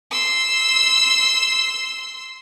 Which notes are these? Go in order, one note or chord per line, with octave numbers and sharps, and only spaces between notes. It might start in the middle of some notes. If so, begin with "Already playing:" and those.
C6 E6